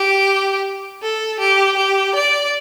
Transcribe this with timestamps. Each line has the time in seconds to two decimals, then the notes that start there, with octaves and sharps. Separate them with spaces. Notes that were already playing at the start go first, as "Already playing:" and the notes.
Already playing: G4
1.02 A4
1.40 G4
1.77 G4
2.15 D5